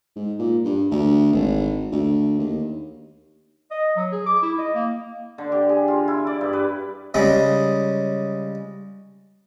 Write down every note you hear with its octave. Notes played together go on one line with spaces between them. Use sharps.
G#2
A#2
G2
D2
G#1
D2
D#2
D#5
F#3
G#4
D6
E4
D#5
A#3
D3
G4
G#4
F4
E4
D5
G2
B4
C#3 G3 G#3 C#4